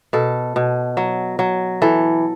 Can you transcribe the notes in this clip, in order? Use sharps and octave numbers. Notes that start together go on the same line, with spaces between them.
B2 A4
B2
F#3
F#3
E3 A4